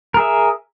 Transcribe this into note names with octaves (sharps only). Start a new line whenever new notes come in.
G#4 A#4 E5